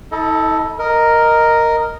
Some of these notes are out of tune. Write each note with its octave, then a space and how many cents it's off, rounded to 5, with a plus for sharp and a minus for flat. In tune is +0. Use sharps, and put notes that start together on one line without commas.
E4 -45 A4 +0 D#5 +20
A#4 +0 D#5 +0